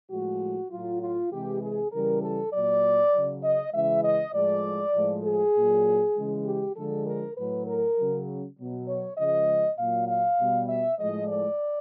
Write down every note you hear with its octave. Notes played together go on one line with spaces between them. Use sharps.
A2 F3 G#3 F#4
A2 F#3 F4
F4
C3 E3 G#3 G4
G#4
C#3 E3 G3 A#4
A4
A#2 F#3 D5
C#3 F#3
D#5
C#3 E3 G#3 E5
D#5
A2 F3 G#3 D5
A2 F3 G#3
G#4
A#2 F#3
C#3 E3 G#3
G4
D3 F3 G#3 A4
A#4
A2 F#3 B4
A#4
C#3 F#3
B2 F#3
C#5
C#3 F3 G#3 D#5
A#2 F#3 F5
F5
B2 G3
E5
A2 F3 G#3 D#5
D5